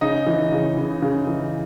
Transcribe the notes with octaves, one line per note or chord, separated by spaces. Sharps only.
C#3 D#4 D#5
E3
C#3
C#3
C#3
E3